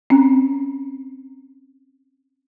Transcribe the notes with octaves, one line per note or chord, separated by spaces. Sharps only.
C4 C#4